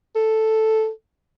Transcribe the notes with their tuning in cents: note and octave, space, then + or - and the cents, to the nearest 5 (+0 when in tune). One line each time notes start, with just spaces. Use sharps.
A4 +0